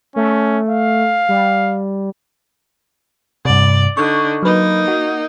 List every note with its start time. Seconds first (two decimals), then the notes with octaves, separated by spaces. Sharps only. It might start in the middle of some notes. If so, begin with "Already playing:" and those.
0.16 A3 C#4
0.70 F5
1.29 G3
3.45 G2 C3 D5
3.97 D3 D#4 C#6
4.43 F#3 A#3 D#4 B4
4.88 F#4